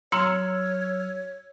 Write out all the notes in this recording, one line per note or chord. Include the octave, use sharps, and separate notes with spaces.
F#3 C#5 A#5 C6 E6 F6 C#7